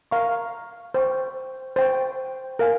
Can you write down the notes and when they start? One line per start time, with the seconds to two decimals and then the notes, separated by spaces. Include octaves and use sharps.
0.11 A#4 F5 A#5 C#6
0.94 C5 G5 C#6
1.76 C5 G5 C#6
2.59 A#4 F5 G#5